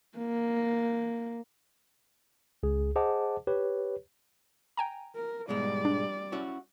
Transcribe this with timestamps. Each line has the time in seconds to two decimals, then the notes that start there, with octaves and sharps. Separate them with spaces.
0.18 A#3
2.63 C#2 G#4
2.96 G#4 C5 D#5 F#5 A5 D6
3.47 G4 B4 C#5
4.77 G5 G#5 A#5
5.15 A#4
5.49 G#2 B2 G3 G#3 D5
5.85 D4
6.32 C#4 E4 F#4